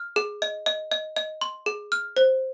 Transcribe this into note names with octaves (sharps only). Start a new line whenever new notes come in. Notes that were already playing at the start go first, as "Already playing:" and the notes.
Already playing: F6
G#4
D#5
D#5
D#5
D#5
C6
G#4
F6
C5